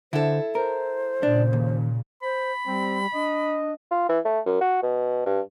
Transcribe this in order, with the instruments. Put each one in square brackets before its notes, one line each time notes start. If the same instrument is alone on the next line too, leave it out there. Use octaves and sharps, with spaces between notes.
[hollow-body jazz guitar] D3 [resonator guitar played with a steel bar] E4 A4 [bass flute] C5
[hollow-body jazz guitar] A#4 [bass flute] C5
[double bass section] A#2 C#3 [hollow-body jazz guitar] D4
[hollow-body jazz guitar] D#2
[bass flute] C5 [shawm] B5
[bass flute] G3 [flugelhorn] C4
[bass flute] D4 [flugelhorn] D#5
[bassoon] F4
E3
A3
F#2
F#4
B2
G2